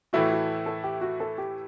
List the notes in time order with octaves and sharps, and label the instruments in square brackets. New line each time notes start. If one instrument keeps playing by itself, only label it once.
[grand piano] A2 E3 A3 E4 [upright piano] F#4
[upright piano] F#4
A4
G4
F#4
A4
G4